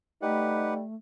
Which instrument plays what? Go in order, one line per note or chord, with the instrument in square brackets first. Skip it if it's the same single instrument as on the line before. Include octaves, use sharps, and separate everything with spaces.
[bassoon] G3 [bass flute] A3 [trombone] D#4 [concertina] G4 B4 F#5